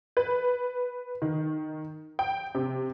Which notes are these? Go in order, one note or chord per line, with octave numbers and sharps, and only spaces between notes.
B4
D#3
G5
C3